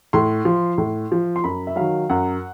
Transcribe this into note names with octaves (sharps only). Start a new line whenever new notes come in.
A2 C6
F3
A2
F3
C6
F#2 B5
E5
D#3 F#3 F5
F#2 F#5